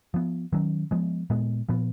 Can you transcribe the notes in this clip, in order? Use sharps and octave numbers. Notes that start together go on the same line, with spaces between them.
F3 B3
D#3 F#3 C#4
F3 G#3 B3
A#2 G#3 B3
A#2 F3 B3